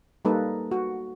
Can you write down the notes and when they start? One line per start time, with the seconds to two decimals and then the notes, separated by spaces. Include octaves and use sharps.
0.25 G3 A#3 D#4 A4 B4
0.71 F#4